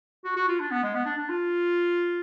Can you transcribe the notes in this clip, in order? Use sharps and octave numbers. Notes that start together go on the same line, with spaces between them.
F#4
F#4
F4
D4
B3
G#3
B3
D4
D4
F4